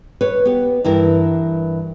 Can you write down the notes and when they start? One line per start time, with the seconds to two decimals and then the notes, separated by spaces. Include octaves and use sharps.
0.21 B4 C#5
0.45 B3 G4
0.84 G2 E3 E4 A#4